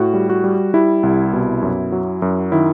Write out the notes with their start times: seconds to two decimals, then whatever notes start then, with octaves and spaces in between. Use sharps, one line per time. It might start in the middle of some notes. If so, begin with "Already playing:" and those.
Already playing: A2 F#4
0.14 G3
0.29 F#4
0.44 G3
0.74 G3 E4
1.03 C2
1.33 B2
1.62 F#2
1.92 F#3
2.22 F#2
2.52 D#3 E4